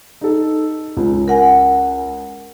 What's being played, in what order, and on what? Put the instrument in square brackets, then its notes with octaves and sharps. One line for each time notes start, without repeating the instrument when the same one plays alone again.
[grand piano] D#4 A4
C#2
[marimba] A#4 F#5 G#5